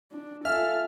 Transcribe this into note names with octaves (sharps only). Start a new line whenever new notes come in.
D4
F4 A4 E5 F5 G#5 F6